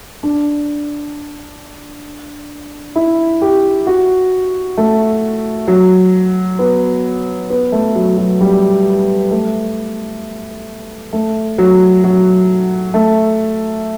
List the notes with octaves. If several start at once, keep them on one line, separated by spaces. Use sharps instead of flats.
D4
E4
G4
F#4
A3
F#3
B3
B3
A3
F#3
F#3
G3
A3
A3
F#3
F#3
A3